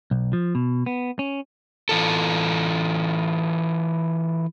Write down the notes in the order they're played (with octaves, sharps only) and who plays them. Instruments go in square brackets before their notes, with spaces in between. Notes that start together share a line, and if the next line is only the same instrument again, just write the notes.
[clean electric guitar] B1
F3
B2
B3
C#4
[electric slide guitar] E3 F4 A4